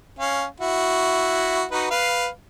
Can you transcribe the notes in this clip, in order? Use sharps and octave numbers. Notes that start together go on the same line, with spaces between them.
C#4 F5
E4 F#4
D#4 F#4 B4
B4 F5